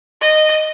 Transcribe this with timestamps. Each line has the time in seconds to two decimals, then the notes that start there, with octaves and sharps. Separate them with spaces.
0.21 D#5